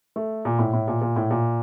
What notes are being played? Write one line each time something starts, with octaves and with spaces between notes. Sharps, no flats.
A3
A#2
A2
A2
A#2
A#2
A2
A#2